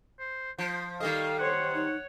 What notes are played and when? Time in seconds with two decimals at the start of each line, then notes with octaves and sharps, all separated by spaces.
0.20 C5
0.58 F3 C5
1.00 D#3 G3 A4 D#5 F5
1.39 C5 C#5 F#5
1.74 D#4 C#5